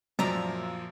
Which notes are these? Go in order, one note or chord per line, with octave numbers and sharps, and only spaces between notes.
F#2 A#2 F3 D5 E5 A#5